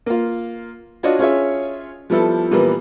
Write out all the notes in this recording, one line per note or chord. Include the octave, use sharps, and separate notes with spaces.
A#3 F4
D4 F4 F#4 C#5 D#5
C#4 F4 G#4 C#5 E5
F3 G3 B3 E4 A4
A#2 E3 G3 A#3 B3